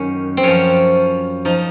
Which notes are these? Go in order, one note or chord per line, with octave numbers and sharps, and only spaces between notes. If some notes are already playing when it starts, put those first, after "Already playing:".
Already playing: F#2 D#3 F#3 C#4
C4
F#2 F3 C#4
F3 D#4